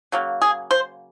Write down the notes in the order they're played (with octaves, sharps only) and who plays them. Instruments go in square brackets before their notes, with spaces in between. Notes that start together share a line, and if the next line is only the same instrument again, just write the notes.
[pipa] C#3 F#3 A#3
G#4
C5